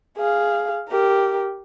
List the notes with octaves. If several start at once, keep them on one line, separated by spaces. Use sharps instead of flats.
G#4 F5
G4 A#4